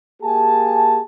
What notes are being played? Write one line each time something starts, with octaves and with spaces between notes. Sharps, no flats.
A#3 G4 G#4 G#5 A5